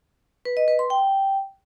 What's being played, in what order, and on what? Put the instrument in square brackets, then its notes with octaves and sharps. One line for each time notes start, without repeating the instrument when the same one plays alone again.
[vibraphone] B4
D#5
B4
C6
G5